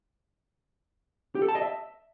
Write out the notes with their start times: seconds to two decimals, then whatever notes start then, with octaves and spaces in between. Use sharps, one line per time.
1.35 G4
1.42 A4
1.48 A5
1.55 D#5
1.62 E5